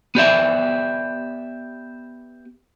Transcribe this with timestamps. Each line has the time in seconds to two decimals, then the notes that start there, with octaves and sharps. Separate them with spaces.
0.15 B3 G4 D5 E5